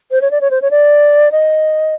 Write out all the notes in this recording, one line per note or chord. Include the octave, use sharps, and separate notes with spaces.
C5
C#5
D5
C#5
C5
C#5
D5
D#5